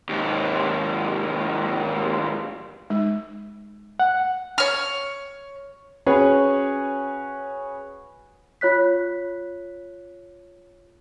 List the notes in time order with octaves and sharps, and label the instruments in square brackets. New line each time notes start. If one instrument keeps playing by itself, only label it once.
[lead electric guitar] D#2 G#2
[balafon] G#3 D#4
[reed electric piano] F#5
[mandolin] C#5 F6
[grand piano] C#4 F#4 G#4 B4 C#5
[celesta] F4 C#5 F#6 B6